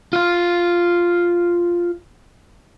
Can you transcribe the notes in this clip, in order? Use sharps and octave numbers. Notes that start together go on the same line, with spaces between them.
F4 F5